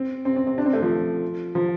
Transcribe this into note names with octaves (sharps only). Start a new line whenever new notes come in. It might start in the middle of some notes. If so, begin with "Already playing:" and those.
Already playing: C4
C4
C4
C4
D4
C4
A3
F3
F3